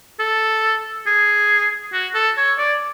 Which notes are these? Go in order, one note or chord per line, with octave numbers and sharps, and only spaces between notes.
A4
G#4
F#4
A4
C#5
D5